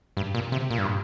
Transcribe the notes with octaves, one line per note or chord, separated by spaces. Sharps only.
G2
A#2
C3
A#2
G2